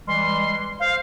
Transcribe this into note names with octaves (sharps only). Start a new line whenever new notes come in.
E3 G3 G#3 C6
C5 F5